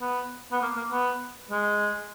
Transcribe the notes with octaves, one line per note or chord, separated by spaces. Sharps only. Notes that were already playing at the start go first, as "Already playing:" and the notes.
B3
B3
A#3
A#3
B3
G#3